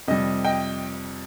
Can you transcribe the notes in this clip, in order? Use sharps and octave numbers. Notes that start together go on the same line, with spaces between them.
F2 C3 G3 D#5
D#5 G5